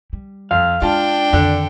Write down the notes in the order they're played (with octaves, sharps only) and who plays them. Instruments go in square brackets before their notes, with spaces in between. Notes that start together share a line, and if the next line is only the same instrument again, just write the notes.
[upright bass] G3
[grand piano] F2 [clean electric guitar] F5
[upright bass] G#3 [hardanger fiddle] D4 G5 [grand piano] F4 A5
[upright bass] F2 D#3 [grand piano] D3